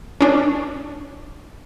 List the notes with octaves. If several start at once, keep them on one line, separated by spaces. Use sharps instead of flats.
C#4 D4